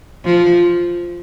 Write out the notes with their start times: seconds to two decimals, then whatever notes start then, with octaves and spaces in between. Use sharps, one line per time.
0.25 F3